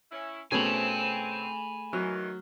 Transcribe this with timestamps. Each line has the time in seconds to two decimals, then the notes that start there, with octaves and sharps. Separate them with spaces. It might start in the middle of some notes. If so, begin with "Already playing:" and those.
0.12 C#4 E4
0.52 B2 A3 C4 C#4 G#4 G#5 B5
1.93 D#3 E3 F#3 F6